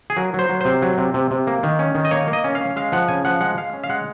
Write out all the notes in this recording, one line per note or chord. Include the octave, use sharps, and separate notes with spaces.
G#4
F#3 A#4
F#3 C5
F#3
C3 C5
F#3
C3
C3
C3
A#3
D#3
C#4
D#3
D#5
A#3 C#5
A#3
D#5
C#4
F5
C#4
G#3 F5
F3 F#5
C#3 G#5
F3 F#5
G#3 F#5
G#3 F5
C#4
F5
G#3 F#5